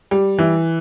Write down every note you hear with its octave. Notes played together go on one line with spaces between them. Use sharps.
G3
E3